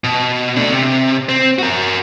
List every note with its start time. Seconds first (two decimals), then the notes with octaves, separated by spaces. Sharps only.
0.04 B2
0.56 A3 D4
0.72 C3
1.29 C4
1.59 F#4 A#4